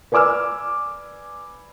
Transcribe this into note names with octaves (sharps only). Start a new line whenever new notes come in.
B4 D5 G#5 D6 E6 F6